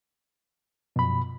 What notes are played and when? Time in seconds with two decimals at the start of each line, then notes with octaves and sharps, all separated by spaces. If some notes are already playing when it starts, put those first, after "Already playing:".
0.96 F#2 B2 F3 B5